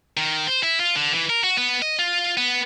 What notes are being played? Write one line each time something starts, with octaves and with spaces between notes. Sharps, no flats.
D#3
C5
E4
F4
D3
E3
A#4
F#4
B3
D#5
F4
B3